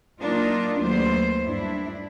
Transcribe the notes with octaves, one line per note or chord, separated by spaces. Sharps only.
F#3 A#3 D4 D#4 F4 A#4
D#2 F#3 A3 B3 C5
G2 D4 E4